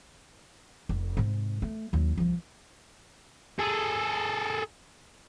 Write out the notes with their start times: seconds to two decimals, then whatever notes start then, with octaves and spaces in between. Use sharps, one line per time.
0.89 F1
1.17 G#2 C3
1.62 A3
1.93 D#2 F#3
2.17 C2 F3
3.59 G#4 A4